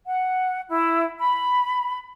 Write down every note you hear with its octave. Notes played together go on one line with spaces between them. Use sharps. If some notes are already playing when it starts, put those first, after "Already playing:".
F#5
E4
B5